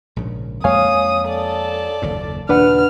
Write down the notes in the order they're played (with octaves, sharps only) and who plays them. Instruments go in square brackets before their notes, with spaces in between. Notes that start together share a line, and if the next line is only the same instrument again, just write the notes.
[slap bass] A#1 G#2 C#3
[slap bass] F2 G#3 A#3 [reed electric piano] C#5 F5 G#5 [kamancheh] D#6
[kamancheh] A4 D5
[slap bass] F#1 D#2 A#2
[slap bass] D#2 A#2 C#3 [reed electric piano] D4 B4 F#5 [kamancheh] F6